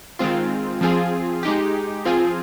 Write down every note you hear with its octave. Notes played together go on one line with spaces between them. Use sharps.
D#3 G#3 C4 F4
F3 C4 F4 G#4
G#3 D#4 G4
F3 C4 F4 G#4